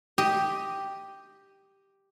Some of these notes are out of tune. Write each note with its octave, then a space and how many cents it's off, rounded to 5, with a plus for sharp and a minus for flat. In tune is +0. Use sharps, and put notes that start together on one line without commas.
G4 +0 D#5 +0